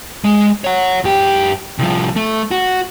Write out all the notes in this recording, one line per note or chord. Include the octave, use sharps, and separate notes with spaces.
G#3
C#5 F#5
F#2 G4
C2 F3
A3
F#4